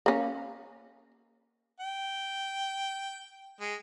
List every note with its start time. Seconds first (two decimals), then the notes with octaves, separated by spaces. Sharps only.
0.06 A#3 C#4
1.80 G5
3.61 G#3